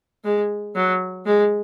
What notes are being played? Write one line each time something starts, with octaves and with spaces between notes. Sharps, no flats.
G#3
F#3
G#3